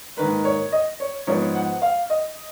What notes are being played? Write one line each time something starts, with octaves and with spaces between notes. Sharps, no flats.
G#2 D#3 A#3 B4
C#5
D#5
C#5
G#2 F3 B3 C#5
F#5
F5
D#5